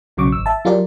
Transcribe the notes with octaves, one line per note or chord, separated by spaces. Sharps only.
B1 C#3 F#3 C#6 D6
G#1 E6
E5 A5
F#3 F4 G4 A#4 D5